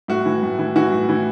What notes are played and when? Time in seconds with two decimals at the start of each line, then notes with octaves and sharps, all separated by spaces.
0.08 A2 F#4
0.26 E3
0.43 A2
0.59 E3
0.76 E3 F#4
0.92 A2
1.09 E3